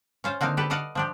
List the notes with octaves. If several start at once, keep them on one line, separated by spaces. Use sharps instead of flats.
C#4 F4 C5
D3 A#3 C4 D#4 F5
G4 A4 B4
A4 D5 D#5 F5 F#5
F3 D4 G4